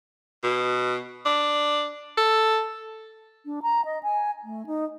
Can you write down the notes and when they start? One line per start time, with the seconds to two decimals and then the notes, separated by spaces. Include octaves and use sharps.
0.43 B2
1.26 D4
2.18 A4
3.46 D4
3.62 A#5
3.85 D#5
4.03 G#5
4.44 A3
4.66 D#4